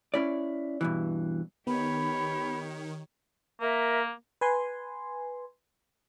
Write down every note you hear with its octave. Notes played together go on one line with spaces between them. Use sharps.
C#4 E4 D5
G2 B2 E3
D#3 B3 G4 C#5 B5
A#3 A#4 E5
B4 G#5 C6